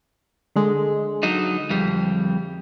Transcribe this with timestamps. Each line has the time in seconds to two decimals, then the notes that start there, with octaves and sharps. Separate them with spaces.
0.56 D3 G#3
1.23 F#3 D#4
1.70 F2 G3